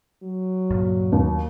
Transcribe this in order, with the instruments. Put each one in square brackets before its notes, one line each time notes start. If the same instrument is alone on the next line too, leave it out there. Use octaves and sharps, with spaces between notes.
[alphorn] F#3
[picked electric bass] C#2 G2 A#2
[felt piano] D#2